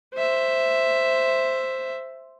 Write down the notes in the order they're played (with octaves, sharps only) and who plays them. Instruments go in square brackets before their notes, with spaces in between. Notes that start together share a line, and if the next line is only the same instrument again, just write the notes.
[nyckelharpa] C5 E5